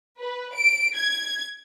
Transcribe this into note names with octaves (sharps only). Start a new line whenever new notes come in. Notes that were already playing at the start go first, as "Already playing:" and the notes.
B4
D7
G#6